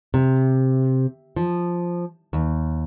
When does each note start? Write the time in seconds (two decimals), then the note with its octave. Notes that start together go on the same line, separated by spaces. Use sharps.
0.14 C3
1.36 F3
2.33 D#2